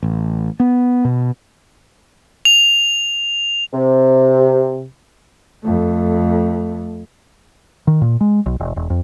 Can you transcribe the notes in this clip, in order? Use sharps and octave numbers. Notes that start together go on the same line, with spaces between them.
A1
B3
B2
F7
C3
F2 A3
D#3
A#2
G#3
B1
E1
E1
F2